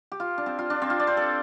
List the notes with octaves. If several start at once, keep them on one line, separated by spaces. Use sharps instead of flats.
G4
F4
D4
C4
F4
D4
C4
F4
D5
C5
A4